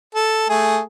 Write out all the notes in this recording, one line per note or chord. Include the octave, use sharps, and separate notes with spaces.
A4
A3 G#4